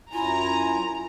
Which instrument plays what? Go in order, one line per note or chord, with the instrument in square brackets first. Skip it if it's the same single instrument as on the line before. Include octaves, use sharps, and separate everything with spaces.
[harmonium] F#2 E4 G#5 [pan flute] F4 [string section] A#5